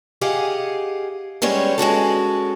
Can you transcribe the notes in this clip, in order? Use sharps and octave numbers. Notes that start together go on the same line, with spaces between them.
G4 G#4 D#5 F5 F#5
G3 G#3 B3 C#4 C#5
G#3 C#4 F#4 A4